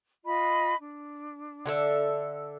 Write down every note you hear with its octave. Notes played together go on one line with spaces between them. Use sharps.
F4 D#5 B5
D4
D3 A4 E5